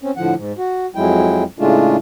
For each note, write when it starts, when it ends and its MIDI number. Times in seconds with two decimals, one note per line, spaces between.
0.02 0.11 60
0.02 0.11 61
0.17 0.34 45
0.17 0.34 50
0.17 0.34 53
0.17 0.34 78
0.36 0.52 44
0.58 0.86 66
0.95 1.44 41
0.95 1.44 54
0.95 1.44 56
0.95 1.44 64
0.95 1.44 79
1.59 1.96 45
1.59 1.96 49
1.59 1.96 56
1.59 1.96 57
1.59 1.96 62
1.59 1.96 65